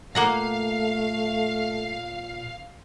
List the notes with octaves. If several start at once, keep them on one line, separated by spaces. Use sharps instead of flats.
A#2 A3 A#3 F5 F#5 A#5